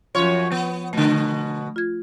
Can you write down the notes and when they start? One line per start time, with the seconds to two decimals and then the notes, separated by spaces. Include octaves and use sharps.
0.15 F#2 F3 F4 C#5 C6
0.51 B3
0.93 B2 D3 A3
1.76 F4 G#6